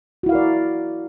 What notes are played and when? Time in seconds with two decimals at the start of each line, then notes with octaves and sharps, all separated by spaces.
0.23 F#4
0.26 E4
0.29 F5
0.32 A#4
0.35 D5